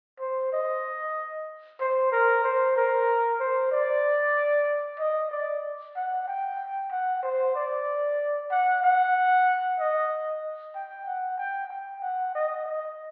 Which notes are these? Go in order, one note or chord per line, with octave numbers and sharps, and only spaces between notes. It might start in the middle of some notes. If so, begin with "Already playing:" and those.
C5
D#5
C5
A#4
C5
A#4
C5
D5
D#5
D5
F#5
G5
F#5
C5
D5
F#5
F#5
D#5
G5
F#5
G5
G5
F#5
D#5
D#5